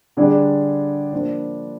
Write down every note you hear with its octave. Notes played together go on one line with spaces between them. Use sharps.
D3 G3 D4 G#4 D5
F3 A#3 D4 F4 C5